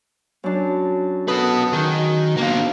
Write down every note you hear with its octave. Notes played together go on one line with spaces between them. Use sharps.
F#2 D4
F#4 A4 B4 D#6 F#6
D#3 D#4 F#4 G#4
B2 A#3 D4 F5